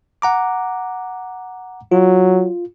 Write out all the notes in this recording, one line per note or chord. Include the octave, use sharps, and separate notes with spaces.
F#5 A#5 D6
F#3 F4